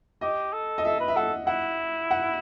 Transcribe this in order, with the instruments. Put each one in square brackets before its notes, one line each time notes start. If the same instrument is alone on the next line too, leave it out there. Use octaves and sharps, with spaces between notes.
[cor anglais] G4 [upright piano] D#5
[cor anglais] A4
[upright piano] D#5
[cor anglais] A4 [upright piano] E5
[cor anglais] B4
[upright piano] E5
[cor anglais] A4 [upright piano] F#5
[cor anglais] E4 [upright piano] F#5
[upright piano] F#5